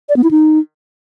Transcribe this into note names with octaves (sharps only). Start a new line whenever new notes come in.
D5
B3
E4
D#4